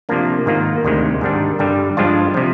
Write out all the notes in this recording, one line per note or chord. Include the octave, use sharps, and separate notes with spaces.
C3 F3 A#3 D4
G#2 D#3 A#3 F4
D2 C3 D#3 G#3
G#2 D#3 G3 D4
G2 D3 G3
G2 F3 G#3 D4 F4
C3 F3